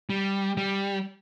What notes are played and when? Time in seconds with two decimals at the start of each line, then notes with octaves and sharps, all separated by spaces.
0.10 G3
0.57 G3